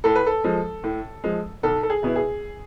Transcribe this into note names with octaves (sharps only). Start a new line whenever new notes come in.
A2 A4
B4
A4
F3 G#3
A2
F3 G#3
B1 A4
A4
G#4
B2 B3 E4
G#4